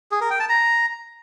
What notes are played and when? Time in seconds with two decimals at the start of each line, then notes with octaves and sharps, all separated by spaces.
0.11 G#4
0.21 A#4
0.30 G5
0.40 A5
0.49 A#5